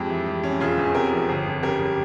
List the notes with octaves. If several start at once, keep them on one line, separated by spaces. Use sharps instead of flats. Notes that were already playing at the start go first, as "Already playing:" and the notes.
Already playing: F2 G#3 G4
E3
G3
C#4
E1 F4 G#4
E2
C3 G4 A#4
F3
G1
F2
C#3 G4 A#4
G3